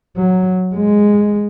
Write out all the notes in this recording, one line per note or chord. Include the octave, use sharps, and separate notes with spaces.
F#3
G#3